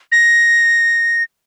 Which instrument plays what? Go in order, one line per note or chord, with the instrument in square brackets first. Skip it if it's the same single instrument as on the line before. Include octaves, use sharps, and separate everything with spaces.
[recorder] A#6